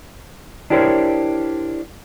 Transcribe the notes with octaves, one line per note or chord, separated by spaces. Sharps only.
D4 E4 G4 A#4 C5 C#5